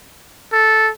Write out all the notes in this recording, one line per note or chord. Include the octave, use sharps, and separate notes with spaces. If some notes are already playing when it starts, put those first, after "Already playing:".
A4